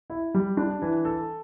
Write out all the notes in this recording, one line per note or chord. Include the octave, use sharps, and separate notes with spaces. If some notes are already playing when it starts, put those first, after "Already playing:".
E4
G3
D4
E3
A4